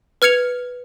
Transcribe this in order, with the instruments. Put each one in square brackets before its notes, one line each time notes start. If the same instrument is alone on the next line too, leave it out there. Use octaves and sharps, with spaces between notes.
[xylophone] B4 F6 G#6 C#7 F7